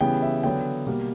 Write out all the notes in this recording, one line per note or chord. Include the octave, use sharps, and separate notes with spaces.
C#3 E3 G3 B3 G5
E5
D3 F#3 B3 G5
B2 G3 A#3